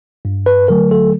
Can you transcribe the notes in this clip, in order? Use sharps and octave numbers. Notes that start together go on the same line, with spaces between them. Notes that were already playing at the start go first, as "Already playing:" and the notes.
G2
B4
D3 F#3 A3 A#4
A4